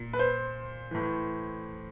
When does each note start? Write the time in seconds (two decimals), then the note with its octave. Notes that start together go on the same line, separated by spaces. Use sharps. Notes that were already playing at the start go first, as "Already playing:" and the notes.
Already playing: A#2
0.13 B4
0.19 C5
0.91 A2 E3